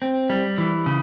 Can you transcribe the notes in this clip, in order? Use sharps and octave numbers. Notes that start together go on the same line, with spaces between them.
C4
G3
E3
C#3